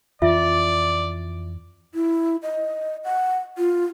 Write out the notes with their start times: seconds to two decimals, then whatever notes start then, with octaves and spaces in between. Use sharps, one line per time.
0.22 F2 E3 F4 D5 E5
1.95 E4
2.43 D#5
3.04 F#5
3.58 F4